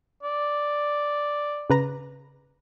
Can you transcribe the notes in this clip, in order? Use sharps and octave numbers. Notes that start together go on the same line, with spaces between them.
D5
C#3 B4 A#5